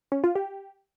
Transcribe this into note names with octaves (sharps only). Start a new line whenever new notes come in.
C#4
F4
G4